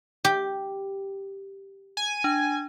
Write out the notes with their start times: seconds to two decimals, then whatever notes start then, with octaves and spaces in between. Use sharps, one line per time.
0.25 G4
1.97 G#5
2.24 D4